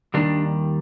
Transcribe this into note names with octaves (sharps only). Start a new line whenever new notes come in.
D#2 D#3 G3 D4